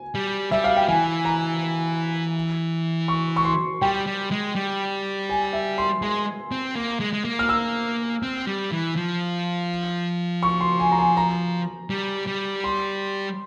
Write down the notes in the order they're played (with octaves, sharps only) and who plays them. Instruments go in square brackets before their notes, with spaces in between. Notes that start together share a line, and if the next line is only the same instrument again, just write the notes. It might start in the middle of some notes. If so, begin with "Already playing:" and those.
Already playing: [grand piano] G#5
[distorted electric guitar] G3
[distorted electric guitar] G3 [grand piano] E5
[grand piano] F5
G5
[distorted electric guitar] E3 [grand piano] G#5
[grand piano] A#5
C#6
C#6
C6
[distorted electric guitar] G3 [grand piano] G5
[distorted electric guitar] G3
G#3
G3
[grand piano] G#5
E5
C6
[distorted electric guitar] G#3 [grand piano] C6
[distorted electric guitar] C4
A#3
G#3
G#3
A#3
[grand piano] F6
E6
[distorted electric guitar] C4
G3
E3
F3
[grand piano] C#6
C6
G#5
A#5
G#5
A#5
[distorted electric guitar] G3
G3
[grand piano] C6